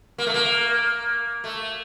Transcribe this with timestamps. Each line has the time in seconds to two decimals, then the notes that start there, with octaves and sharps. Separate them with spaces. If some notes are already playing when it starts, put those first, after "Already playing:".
0.18 A#3
0.27 A3
0.34 A#3
1.44 A3